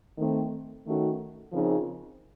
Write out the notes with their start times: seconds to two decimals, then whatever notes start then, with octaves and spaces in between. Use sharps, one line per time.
0.18 D#3 A3 C4
0.85 D#3 A3 C#4 F#4
1.53 C#3 F3 C4 D#4 A#4